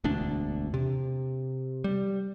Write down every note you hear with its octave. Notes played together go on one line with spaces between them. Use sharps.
E1 D2 D4
C3
G3